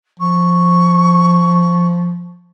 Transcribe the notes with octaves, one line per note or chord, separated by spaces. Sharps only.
F3 C#6